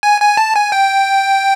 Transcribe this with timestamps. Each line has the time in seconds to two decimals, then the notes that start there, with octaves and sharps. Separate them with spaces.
0.03 G#5
0.21 G#5
0.37 A5
0.55 G#5
0.72 G5